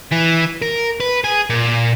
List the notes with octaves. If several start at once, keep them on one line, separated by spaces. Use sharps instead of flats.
E3
A#4
B4
G#4
A#2